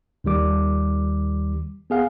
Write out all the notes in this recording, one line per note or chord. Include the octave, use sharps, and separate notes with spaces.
D#2 D#3 G3 D6
B3 G#4 F5 F#5